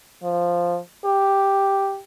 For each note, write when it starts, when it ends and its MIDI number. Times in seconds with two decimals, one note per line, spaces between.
0.23 0.78 53
1.05 1.98 67